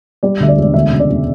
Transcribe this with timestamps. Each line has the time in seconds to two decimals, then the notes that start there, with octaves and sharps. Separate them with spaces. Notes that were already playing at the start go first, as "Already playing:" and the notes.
0.23 G3 D5
0.40 D2 E5
0.48 D5
0.58 E1
0.63 D5
0.74 D2 E5
0.91 C#3
1.00 D5
1.09 E1